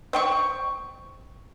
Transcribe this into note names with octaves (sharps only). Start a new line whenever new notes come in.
C5 G5 C#6